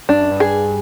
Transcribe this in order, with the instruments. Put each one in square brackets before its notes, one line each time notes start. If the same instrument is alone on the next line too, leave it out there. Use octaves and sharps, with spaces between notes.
[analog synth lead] G2 [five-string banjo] D4
[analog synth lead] F#2
G2
[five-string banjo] G#4